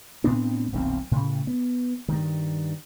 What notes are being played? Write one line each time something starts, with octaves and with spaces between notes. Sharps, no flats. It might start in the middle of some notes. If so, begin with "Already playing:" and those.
A2 B3 C4 D4
D#1 B1 F#2 C4
A2 C#3
B3
G2 D#3